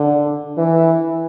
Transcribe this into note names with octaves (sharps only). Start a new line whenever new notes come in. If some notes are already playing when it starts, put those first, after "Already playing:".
Already playing: D3
E3